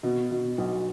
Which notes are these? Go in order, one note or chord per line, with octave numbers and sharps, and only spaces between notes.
B2
B2
B1